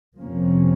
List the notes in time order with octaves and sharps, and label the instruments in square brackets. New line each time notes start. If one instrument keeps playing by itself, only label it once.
[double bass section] F2 C3 F3 A#3 C#4